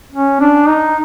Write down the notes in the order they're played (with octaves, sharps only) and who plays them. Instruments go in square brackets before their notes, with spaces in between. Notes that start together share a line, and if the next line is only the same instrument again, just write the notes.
[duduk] C#4
D4
D#4